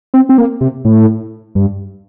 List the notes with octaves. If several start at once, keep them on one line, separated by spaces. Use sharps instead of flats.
C4
C4
A#3
C3
A2
G2